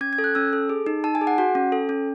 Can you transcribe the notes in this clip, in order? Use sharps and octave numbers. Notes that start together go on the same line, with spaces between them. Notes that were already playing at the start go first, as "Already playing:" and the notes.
C#4 G#6
G#6
A4
F#6
C#4 E6
A4
G#4
D#4
D#4 A5
G#5
G#4
F#5
F#4 F#5
C#4
A4
C#4